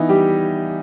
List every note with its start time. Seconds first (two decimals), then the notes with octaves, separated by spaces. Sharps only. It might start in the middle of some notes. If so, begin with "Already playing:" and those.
Already playing: E3 B3 D#4 E4
0.09 G3 G4